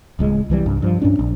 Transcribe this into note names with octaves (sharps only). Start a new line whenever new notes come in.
D1 C#2 G#3
C2 E3 G3
C2 G2
G2 F3
G2 C#4 D4
A#1